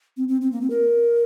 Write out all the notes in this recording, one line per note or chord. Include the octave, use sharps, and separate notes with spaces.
C4
C4
C4
A#3
C4
A#4